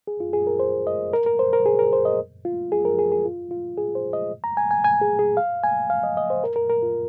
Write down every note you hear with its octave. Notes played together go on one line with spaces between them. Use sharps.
G#4
F4
G#4
A#4
C5
D#5
A#4
A#4
C5
A#4
G#4
A#4
C5
D#5
F4
G#4
A#4
G#4
G#4
F4
F4
G#4
C5
D#5
A#5
G#5
G#5
G#5
G#4
G#4
F5
G#5
F5
D#5
D#5
C5
A#4
A#4
A#4
F4